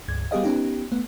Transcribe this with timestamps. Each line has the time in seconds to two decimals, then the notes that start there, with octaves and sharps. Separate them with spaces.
0.08 C#2 G2 G#6
0.31 G3 B3 G4 G#4 D#5 F5
0.43 B3 C#4 D#4 G4
0.92 A3 B3